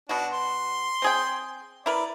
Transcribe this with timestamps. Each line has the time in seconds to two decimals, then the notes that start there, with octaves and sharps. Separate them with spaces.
0.09 B2 D4 F#4
0.32 C6
1.02 C4 G#4 G5
1.86 E4 A#4 B4 D5